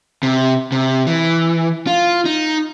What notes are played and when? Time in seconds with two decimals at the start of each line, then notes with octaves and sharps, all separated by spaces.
0.23 C3
0.72 C3
1.07 E3
1.87 F4
2.25 D#4